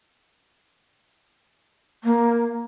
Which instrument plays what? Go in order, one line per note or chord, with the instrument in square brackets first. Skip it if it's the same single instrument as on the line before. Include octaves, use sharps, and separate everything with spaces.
[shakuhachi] A#3